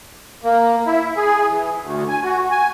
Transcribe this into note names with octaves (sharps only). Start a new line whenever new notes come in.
A#3
E4
G#4
E3
D2
G#5
F#4
G#5